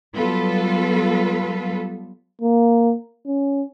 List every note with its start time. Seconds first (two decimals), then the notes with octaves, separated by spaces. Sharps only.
0.14 F#3 G3 B3 F4 A4 B4
2.42 A#3
3.27 C#4